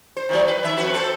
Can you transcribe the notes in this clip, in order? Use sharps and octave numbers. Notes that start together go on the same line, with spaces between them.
C5
D#3 E3 F#3
B4
D#3 E5
F2 F#4 B4
C4 A4 C5